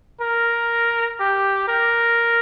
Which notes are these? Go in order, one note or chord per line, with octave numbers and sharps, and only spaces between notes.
A#4
G4
A#4